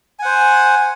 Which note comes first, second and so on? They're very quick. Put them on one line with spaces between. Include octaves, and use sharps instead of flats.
G#5 F#5 C5